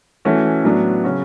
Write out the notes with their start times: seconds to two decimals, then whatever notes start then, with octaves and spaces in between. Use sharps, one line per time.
0.25 E3 A3 C#4 F#4
0.64 A2 F#3 B3 D4
1.04 C#3 F#3 C#4 F#4